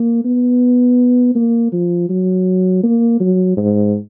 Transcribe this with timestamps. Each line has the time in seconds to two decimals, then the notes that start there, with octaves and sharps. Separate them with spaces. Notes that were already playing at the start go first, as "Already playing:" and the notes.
Already playing: A#3
0.25 B3
1.35 A#3
1.73 F3
2.10 F#3
2.84 A#3
3.20 F#3
3.57 G#2